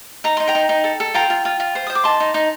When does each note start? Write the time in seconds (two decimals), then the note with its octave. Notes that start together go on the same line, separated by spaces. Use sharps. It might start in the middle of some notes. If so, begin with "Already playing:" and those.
0.24 D#4 A#5
0.37 D#4 C6
0.47 G5 A#5
0.55 D#4
0.69 D#4
0.84 A4
1.00 A4
1.14 F4 G5 A#5
1.30 F4
1.45 F4
1.60 F4
1.75 C5
1.87 C5 D#6
1.95 D6
2.04 D#4 A5 C6
2.20 D#4
2.34 D#4